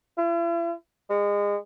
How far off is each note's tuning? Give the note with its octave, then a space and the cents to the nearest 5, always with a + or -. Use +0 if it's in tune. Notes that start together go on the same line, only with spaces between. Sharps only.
E4 +45
G#3 -30